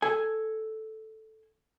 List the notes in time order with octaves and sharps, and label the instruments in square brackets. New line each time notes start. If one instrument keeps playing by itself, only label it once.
[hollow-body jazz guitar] A4 G#5